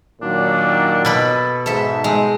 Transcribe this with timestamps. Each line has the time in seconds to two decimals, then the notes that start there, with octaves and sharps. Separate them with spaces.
0.22 A#2 D#3 F#3 D4
1.05 B2 A4 B4 B5
1.66 G#2 A4 E5 B5
2.04 G#3 C4